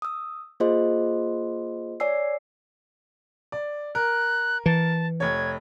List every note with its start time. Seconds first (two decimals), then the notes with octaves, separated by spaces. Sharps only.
0.02 D#6 E6
0.60 A#3 F4 G#4 C5 D#5 C6
2.00 C#5 D5 G#5 E6 C7
3.52 D5
3.95 A#4 F#6
4.66 E3 A5
5.20 F1 C#5 G#6